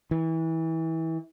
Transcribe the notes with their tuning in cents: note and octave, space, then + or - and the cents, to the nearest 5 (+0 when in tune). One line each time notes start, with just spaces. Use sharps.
E3 -25